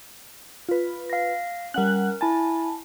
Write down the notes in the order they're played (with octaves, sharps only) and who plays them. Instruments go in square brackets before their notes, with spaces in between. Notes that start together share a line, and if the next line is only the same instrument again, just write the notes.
[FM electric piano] F4 B4
[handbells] F5 A#6
[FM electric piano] G3 F#5 F#6 [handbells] C#4 A#4
[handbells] E4 G#5 [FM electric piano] A5